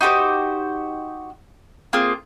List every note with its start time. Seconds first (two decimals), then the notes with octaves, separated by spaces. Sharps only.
0.01 D#4 F#4 G4 C5
1.93 A#3 C4 F4 G#4